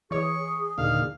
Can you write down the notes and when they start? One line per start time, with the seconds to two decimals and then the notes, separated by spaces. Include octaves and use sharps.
0.11 E3 G#4 C#5 C#6
0.78 D#2 A#2 D3 F5